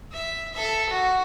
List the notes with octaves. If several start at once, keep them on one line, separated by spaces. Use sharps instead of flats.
E5
A4 E5
F#4